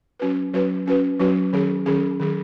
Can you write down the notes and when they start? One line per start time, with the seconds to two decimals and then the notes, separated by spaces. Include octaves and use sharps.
0.20 F#3 C#4 F#4 B4
0.53 F#3 C#4 F#4 B4
0.86 F#3 C#4 F#4 B4
1.19 F#3 C#4 F#4 B4
1.53 D#3 F#3 C#4 G#4
1.86 D#3 F#3 C#4 G#4
2.20 D#3 F#3 C#4 G#4